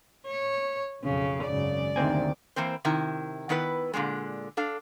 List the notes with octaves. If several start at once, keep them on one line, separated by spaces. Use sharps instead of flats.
C#5
B1 F2 C#3
G#1 F#2 C#3 D5
D2 C3 D#3 A#3 C4 G#5
E3 A#3 C4 C5
C3 D#3 E4
D#3 B3 E4 B4
A#2 D3 D#3 G#3
D4 A4 F5